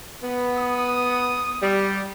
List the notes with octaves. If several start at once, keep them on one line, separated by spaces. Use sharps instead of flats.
B3
D#6
G3